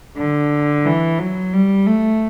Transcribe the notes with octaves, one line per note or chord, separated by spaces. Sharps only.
D3
E3
F#3
G3
A3